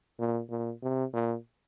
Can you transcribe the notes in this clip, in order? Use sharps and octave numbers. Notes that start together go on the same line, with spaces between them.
A#2
A#2
C3
A#2